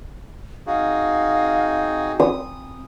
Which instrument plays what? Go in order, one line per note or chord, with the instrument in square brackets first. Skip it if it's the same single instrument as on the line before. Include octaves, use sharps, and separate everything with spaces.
[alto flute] C4 [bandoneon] D#4 F#4 G#4 [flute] F5
[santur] D#6